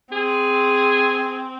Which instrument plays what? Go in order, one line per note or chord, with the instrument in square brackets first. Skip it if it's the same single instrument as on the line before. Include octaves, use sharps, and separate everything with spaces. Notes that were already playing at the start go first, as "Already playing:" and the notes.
[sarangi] C4 [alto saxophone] G#4